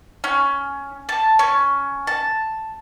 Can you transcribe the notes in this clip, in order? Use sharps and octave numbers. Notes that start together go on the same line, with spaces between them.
C#4
A5
C#4
A5